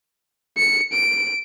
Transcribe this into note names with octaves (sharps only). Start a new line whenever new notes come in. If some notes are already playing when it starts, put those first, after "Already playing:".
C#7
D7